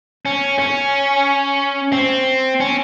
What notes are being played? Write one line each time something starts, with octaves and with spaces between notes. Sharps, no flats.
C#4
C#4
C4
C#4